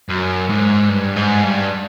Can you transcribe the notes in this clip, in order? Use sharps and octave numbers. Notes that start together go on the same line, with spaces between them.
F#2
G#2
G2
G#2
G2